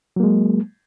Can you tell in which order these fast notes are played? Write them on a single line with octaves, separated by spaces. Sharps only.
F#3 A#3 G#3